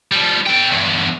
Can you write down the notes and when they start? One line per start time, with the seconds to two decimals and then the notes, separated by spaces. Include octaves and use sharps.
0.12 F3 G3
0.47 A4 G5
0.72 E2 G2